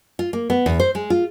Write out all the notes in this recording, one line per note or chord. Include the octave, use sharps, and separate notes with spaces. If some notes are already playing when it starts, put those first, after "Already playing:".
F4
A#3
B3
E2
C5
G#3
F4